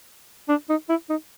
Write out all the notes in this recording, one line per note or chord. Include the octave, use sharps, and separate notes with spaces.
D4
D#4
E4
D#4